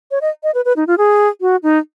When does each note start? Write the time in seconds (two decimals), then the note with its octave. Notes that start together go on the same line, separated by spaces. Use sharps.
0.11 C#5
0.21 D#5
0.43 D#5
0.55 B4
0.65 B4
0.76 D#4
0.87 F4
0.98 G#4
1.41 F#4
1.63 D#4